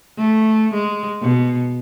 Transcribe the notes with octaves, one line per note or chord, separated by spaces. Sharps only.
A3
G#3
B2